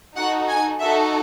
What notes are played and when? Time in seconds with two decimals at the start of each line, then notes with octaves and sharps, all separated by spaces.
0.16 D#4 F#4 A4 F#5
0.49 G#5
0.80 D#4 F#4 A4 E5